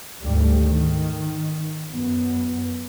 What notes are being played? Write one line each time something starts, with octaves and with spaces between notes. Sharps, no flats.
D2 G#2 G3 A3
D#3
F#2 B3